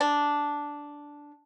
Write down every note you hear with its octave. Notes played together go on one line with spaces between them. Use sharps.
D4